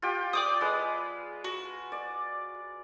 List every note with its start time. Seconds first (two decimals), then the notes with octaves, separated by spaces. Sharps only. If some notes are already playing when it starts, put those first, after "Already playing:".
0.02 F4 G4 G5
0.33 D5 G5 D6 D#6
0.61 G#3 B4
1.44 F#4
1.92 D5